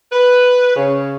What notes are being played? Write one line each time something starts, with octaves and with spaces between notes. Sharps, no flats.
B4
C#3